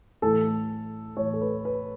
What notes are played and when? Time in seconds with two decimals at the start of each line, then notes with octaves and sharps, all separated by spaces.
0.22 A2 E3 A4
1.17 A2 E3 C#5
1.33 A4
1.41 B4
1.65 B4